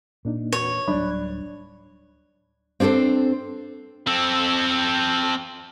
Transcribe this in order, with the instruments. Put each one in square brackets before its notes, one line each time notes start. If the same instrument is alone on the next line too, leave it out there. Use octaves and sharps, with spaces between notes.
[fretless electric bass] A#2 [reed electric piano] A#3 D4 D#4
[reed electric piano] E2 F#4 B4 [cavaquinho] C#5
[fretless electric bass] D1 F#3 G3 [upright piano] D4 [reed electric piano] B5 F#6
[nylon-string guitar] C4 D4 G#4 A4 C5
[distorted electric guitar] C4 A4